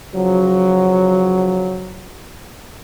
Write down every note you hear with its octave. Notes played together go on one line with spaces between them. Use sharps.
C#3 F3 F#3